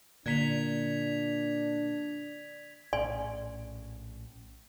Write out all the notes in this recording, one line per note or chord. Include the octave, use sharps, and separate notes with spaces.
A#2 D3 A#3 D4 G#6 B6 F7
A#1 A2 C#4 D5 G#5 C6